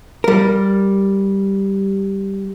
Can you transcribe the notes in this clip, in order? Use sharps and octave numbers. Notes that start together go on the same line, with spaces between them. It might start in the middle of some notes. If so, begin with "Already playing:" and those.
G3 A#4